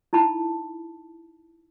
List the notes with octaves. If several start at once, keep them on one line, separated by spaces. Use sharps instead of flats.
D#4 E4 A5 B5